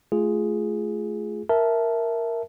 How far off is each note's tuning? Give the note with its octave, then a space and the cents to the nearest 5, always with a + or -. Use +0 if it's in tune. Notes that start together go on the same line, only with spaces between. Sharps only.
A3 -25 F4 -10 G#4 +0
A#4 +0 E5 +0 A5 -10